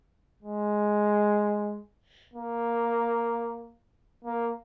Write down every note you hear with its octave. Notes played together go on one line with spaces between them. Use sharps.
G#3
A#3
A#3